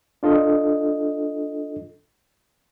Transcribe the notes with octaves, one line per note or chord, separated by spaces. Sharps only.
D4 F4 A4 D#5